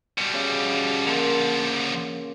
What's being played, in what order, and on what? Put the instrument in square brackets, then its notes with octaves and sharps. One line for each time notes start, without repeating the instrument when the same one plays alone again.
[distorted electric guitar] B2 G3
[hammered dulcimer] C#3
[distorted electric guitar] D3 F3 [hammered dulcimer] A#3